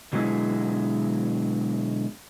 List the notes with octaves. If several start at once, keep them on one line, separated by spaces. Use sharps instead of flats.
B2 D3 F#3 G#3 E4 G#4